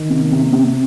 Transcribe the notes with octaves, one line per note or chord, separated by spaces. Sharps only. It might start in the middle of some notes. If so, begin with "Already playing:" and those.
Already playing: D#3
C3
C3
C3